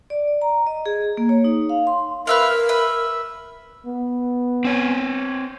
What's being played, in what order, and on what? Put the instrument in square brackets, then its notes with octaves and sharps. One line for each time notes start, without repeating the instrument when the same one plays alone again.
[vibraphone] D5
A#5
D#5
G#4
A#3
C#5
D#4
F5
C6
[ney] A#4 [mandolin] B4 E5 F5
[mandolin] B4 E5
[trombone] B3
[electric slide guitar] C4 C#5